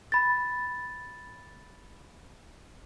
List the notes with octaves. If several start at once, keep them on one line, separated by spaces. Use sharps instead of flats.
B5 A6